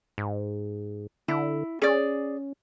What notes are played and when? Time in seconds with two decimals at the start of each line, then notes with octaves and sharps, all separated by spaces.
0.18 G#2
1.28 D3 E4
1.82 C#4 G#4 D5